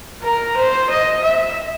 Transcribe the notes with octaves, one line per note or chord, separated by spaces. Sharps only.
A#4
C5
D#5
E5